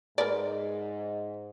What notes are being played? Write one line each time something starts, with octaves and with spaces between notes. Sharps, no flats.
G#2 A#4 B4 D5